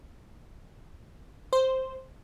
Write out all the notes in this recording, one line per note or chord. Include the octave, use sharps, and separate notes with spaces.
C5